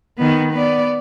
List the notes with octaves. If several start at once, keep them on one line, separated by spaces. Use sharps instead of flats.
D#3 B3
B3 D5